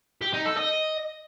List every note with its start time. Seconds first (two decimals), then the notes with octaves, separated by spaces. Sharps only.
0.22 G4
0.33 D#4
0.45 A4
0.57 D#5